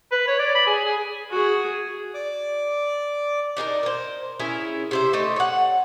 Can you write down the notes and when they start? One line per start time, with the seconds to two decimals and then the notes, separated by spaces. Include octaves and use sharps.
0.12 B4
0.28 C#5
0.39 D5
0.55 B5
0.67 G#4
0.85 G#4
1.31 F#4 G#4
2.14 D5 D6
3.57 D4 D#4 G#4 A#4
3.83 A#4 C5
4.40 C#4 E4 G#4 A#4
4.91 C3 C5 E5
5.13 A3 D#4 G4
5.36 C#5 F#5